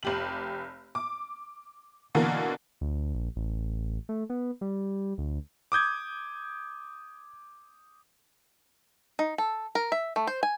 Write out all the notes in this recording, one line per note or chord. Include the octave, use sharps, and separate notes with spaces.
F1 G4 F#7
D6
B2 D3 E3 A#3 A#4
D2
A#1
A1
A3
B3
G3
D2
D6 D#6 G6 G#6
D#4
A4
A#4
E5
A3
C5
G#5